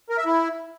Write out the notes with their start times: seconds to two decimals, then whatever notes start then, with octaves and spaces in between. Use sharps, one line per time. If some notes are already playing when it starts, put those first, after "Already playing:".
0.10 A#4
0.18 E5
0.26 E4